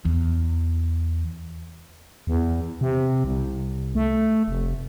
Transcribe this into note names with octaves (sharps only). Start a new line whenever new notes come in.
E2
E2
C3
C2
A3
F1